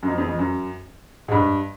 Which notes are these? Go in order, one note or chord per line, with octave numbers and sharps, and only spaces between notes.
F#2
F2
E2
F2
F#2
G#2
G2